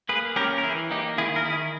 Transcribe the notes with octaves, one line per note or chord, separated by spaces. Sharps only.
A#3 G#4 B4
C#4 G4 A#4
A#4
E3 E4 G#4
A#3 D#4 G4
D#3 E4 G#4
A#4
D#3 E4 G#4